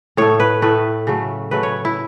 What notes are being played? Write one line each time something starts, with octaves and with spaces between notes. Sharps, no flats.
A2 A3 C#5
B4
A2 A3 B4
C#3 F#3 A3
C#3 F#3 A3 B4
C#5
E4